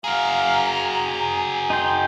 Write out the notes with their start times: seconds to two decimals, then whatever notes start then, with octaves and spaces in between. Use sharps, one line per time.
0.04 F#4 G#4 F5 A#5
0.66 G#5
1.70 D#4 G5 C6